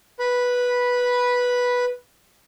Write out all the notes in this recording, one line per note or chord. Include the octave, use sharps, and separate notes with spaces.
B4 B5